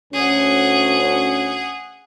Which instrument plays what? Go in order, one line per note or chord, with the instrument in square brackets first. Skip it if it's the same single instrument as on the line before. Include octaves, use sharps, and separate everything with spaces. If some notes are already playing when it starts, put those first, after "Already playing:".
[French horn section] D2 C#4 [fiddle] G#4 F#5